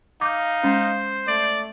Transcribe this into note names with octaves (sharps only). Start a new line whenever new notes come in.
D#4 F5 D6 G6
G#3 C#4 C5
A3 D5